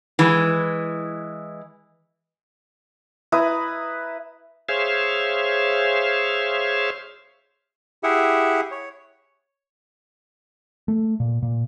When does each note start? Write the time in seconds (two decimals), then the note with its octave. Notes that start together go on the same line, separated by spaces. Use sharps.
0.19 E3 G#3
3.32 E4 B4 A#5 D#6
4.69 G#4 C5 C#5 E5 F5
8.03 E4 G4 G#4 E5 F#5
8.71 C#5
10.88 A3
11.20 A#2
11.42 A#2